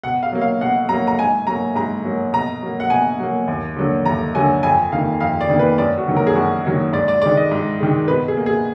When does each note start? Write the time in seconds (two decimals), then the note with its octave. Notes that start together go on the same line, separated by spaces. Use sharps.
0.03 B2 F#5
0.23 F5
0.32 F#3 A#3
0.41 F5
0.61 B2 F#5
0.89 F#3 A#3 A#5
1.07 A#5
1.19 G#2 G#5
1.47 F#3 A#3 A#5
1.76 G#2 A#5
2.05 F#3 A#3
2.33 B2 A#5
2.62 F#3 A#3
2.80 F#5
2.90 B2 G#5
3.20 F#3 A#3
3.48 D#2
3.76 D3 F#3 A#3
4.05 D#2 A#5
4.34 D3 F#3 A#3 G#5
4.63 F2 G#5
4.92 D#3 A#3 F5
5.20 F2 F5
5.41 D5
5.49 D#3 A#3
5.59 B4
5.78 F#2 D5
5.98 F#4
6.08 D#3 F#3 A#3
6.16 A#4
6.27 G#4
6.35 F#2 F#4
6.64 D#3 F#3 A#3
6.93 G#2 D5
7.08 D5
7.22 D#3 G#3 D5
7.37 D#5
7.51 G#2
7.80 D#3 G#3
8.08 B2 B4
8.28 G#4
8.37 A#3
8.46 G#4